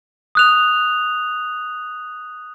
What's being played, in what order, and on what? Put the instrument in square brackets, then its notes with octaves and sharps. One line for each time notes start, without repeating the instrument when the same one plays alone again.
[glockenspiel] D#6 F#6 F7